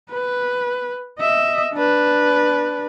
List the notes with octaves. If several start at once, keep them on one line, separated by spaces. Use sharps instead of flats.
B4
D#5 E5
D4 B4